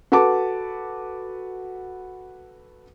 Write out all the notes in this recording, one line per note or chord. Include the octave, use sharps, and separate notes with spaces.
F#4 A4 B4 A5 D6